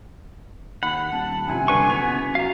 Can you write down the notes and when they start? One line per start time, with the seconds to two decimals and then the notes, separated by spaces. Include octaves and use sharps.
0.83 D#2 F#5 B5
1.12 D#1 A5
1.47 G2 C3 F3 G#5
1.68 D3 B4 C#6
1.90 F#1 B3 F7
2.35 F#3 F5 A#5